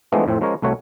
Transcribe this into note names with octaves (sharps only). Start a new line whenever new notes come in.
E3 F3 G#3 A3 B3 D4
F2 A2 C4
F3 G#3 C#4 A#4 C#5
C2 A3 F#4 C#5